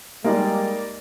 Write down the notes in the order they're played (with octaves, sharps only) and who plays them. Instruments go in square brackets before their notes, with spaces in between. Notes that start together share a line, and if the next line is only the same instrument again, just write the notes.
[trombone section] G3 G#3 [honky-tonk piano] A#3 D#4 D5